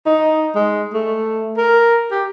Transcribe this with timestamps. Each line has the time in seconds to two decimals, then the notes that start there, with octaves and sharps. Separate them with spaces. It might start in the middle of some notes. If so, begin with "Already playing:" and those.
0.06 D#4
0.55 G#3
0.93 A3
1.58 A#4
2.11 G4